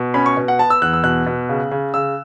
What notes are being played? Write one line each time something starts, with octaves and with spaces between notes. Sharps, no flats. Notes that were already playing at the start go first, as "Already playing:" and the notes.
Already playing: B2
C#4 B5
C#6
B2
F#5
B3 A5
E6
E2 F#6
E6
B2 F#6
B2
C#3
C#3
C#3 E6